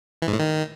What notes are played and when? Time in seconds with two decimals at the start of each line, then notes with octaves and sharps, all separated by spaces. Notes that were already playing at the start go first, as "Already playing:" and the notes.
0.22 E3
0.28 G#2
0.33 A2
0.39 D#3